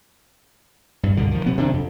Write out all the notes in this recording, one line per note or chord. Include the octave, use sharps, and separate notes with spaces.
G2
C#2 G2 B2 D3
D#3 F3
C3 F#3 B3
C3 D#3 D4
F2